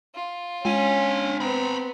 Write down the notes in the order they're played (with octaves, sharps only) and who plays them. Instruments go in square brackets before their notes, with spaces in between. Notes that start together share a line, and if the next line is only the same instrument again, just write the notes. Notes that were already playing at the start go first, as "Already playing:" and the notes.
[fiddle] F4
[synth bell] G#3 D#7 [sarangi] C#4 [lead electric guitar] D4 G#5
[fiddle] B3 [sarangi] C4 [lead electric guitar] A#5 B5